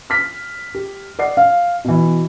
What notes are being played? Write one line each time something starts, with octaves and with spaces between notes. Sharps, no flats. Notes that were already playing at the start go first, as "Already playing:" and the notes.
F6 B6
G4
D5 D#5 F#5 C7
F5
B2 E3